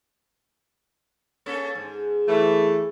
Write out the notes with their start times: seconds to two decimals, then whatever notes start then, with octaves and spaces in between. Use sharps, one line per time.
1.46 A#3 C#4 A4
1.75 G#2
2.28 E3 A3